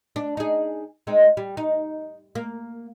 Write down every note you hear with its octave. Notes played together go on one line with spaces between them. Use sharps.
D4
D#4 G#4
G#3 C4 D#4
G3
D#4
A#3